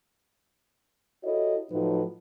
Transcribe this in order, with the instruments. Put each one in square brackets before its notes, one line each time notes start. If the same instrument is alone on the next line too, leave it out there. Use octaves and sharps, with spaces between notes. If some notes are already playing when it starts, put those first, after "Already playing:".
[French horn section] E4 F#4 G4 A4 C#5 D#5
A2 F3 F#3 A3 D#4 B4